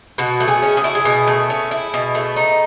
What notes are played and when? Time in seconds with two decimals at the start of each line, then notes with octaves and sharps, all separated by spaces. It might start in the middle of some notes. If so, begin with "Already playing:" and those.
0.18 B2 F#4
0.40 A3
0.48 G#4
0.63 C#4
0.77 G#4
0.84 E4 F#4
0.95 G#4
1.05 B2
1.27 A3
1.50 C#4
1.71 E4
1.94 B2
2.15 A3
2.36 D#4